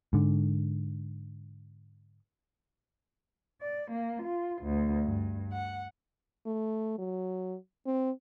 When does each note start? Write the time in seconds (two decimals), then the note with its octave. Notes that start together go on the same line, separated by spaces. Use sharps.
0.13 G#2 D3
3.61 D5
3.91 A#3
4.22 F4
4.63 D2
5.05 G2
5.52 F#5
6.46 A3
6.99 F#3
7.86 C4